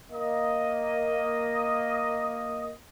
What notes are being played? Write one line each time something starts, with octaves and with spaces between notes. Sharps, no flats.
A#3 D#5